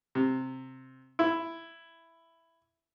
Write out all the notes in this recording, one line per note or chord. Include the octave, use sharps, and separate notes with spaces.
C3
E4